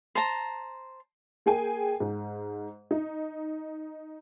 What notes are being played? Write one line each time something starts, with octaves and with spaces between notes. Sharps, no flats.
C5 A5 A#5
A#3 G#4 G5 G#5
G#2
D#4